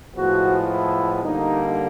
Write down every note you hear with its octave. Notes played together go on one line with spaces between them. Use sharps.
A2 F3 G#3 B3 F#4
E4
D3 G3 A#3 D#4